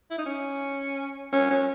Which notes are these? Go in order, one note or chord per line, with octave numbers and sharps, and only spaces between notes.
E4
D#4
C#4
C#4
C#4